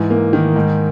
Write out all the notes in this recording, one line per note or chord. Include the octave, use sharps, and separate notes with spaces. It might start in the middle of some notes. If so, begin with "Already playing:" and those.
Already playing: G#2 E3
A#3
D#3
G#2